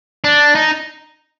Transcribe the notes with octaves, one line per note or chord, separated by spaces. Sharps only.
D4
D#4